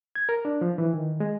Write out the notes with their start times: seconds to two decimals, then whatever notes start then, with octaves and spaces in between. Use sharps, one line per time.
0.15 G#6
0.29 A#4
0.45 D4
0.61 F3
0.78 E3
0.94 D#3
1.20 G#3